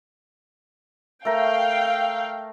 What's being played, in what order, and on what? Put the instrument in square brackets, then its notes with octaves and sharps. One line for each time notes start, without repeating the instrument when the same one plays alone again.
[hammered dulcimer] A3 A#4 [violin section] F5 G5